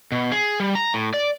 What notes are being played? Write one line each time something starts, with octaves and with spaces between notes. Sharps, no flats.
B2
G#4
G3
A#5
A2
D5